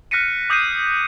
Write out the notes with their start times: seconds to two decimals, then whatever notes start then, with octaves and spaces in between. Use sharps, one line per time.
0.11 F6 F#6 A#6 B6 C#7 D#7
0.50 D6 D#6 G6 A#6 C7 D#7